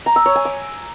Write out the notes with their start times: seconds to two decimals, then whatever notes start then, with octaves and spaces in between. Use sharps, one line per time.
0.06 A#5
0.16 E6
0.26 C#5
0.35 G#5
0.45 D6